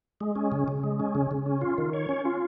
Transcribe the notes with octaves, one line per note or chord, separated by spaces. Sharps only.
G#3
C#4
C#3
C#3
G#3
C#4
C#3
C#3
C#4
F4
D#3
C#5
C#4
F4